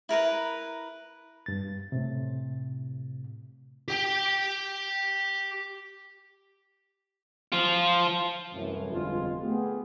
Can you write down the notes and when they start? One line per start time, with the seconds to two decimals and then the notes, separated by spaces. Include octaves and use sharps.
0.09 E4 A#4 B4 A#5
1.46 G2 A6
1.92 A2 C3
3.88 G4 G5
7.52 F3 F4
8.53 C2 F#2 A2 E3
8.91 G1 F2 G#3 F4
9.43 A3 B3 G4 G#4